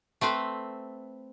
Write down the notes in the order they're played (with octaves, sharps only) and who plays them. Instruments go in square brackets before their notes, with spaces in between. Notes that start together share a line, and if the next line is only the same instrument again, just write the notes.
[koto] A3 C4 B4 C5